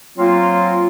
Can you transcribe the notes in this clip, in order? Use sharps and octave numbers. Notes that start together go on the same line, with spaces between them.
F#3 A#3 C4 F4